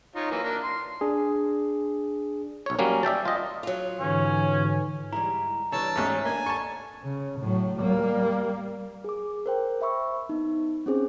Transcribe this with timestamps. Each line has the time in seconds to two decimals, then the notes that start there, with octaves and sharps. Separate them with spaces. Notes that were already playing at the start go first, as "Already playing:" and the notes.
0.15 D#4 F4 C#5
0.31 E3 F#3 A#3
0.43 A#3 D4 A#4
0.63 C6
1.01 D4 G#4
2.66 B1 C#5
2.79 F#3 G3 A#3 C#4
3.03 D5 E5 G5 A5
3.25 F4 D#5
3.63 F#3 F4
4.00 G#2 D3 E3 C#4
5.13 G3 G#3 E4 A#5
5.72 D3 E3 G3 C#5 A5 E6
5.96 A1 G#2 F#3 A3 C#4
6.25 A#3 D4 D#5 G#5
6.46 A4 A5 C#6
7.03 C#3
7.40 A2 F#3
7.80 G3 A#3
9.04 G#4 D6
9.46 A#4 C5 G5
9.81 C5 E5 B5 C#6 E6
10.29 B3 D#4
10.86 C4 C#4 G#4 C5